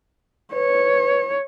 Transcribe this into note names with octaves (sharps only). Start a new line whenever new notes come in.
B4 C#5